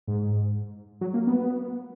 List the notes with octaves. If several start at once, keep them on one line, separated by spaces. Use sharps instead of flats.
G#2
F#3
A#3
B3